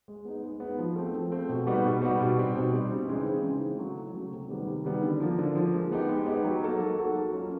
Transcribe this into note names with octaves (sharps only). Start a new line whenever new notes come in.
G#3
B3 D#4
G#3
B3 D#4
F3
A3 C4
F3
A3 C4
B2
G3 B3 D#4 F#4
B2
G3 B3 D#4 F#4
B2
G3 C4 D#4
B2
G3 C4 D#4
C#3
E3 G#3 C4 D#4
C#3
E3 G#3 C4 D#4
C#3
F#3 A3
C#3
F#3 A3
C3
D#3 G3 B3
C3
D#3 G3 B3
D3
F3 A#3
D3
F3 A#3
G#3
B3 D#4 G4
G#3
B3 D#4 G4
F#3
A#3 D#4 F#4 A4
F#3
A#3 D#4 F#4 A4
F#3
A#3 C#4 F4